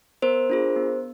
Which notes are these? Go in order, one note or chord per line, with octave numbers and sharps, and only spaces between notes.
B3 A#4 C5
D4 F4 G#4
B3